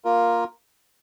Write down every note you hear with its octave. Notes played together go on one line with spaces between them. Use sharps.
A#3 F4 A#4